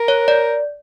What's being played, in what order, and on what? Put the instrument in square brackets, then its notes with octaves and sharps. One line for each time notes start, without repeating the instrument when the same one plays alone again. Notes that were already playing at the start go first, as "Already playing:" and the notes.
Already playing: [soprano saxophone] A#4
[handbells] C#5
D5